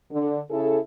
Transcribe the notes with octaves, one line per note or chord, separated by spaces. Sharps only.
D3
C#3 E4 G#4 A4